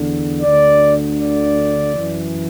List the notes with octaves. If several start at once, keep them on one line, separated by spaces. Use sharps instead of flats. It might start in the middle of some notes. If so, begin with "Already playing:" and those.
Already playing: E2 D3
D2 D3 D5
D5
F#2 E3